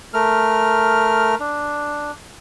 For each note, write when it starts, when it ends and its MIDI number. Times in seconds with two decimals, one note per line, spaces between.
0.14 1.35 57
0.14 1.35 70
0.14 1.35 89
1.40 2.12 62